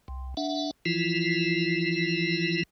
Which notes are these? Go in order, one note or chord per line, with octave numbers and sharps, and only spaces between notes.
C2
D4 E5 F#5
E3 F3 E4 F4